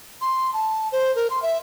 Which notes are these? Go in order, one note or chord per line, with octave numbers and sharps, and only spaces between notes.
C6
A5
C5
A#4
C6
E5